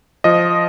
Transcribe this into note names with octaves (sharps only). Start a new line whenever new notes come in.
F3 D#5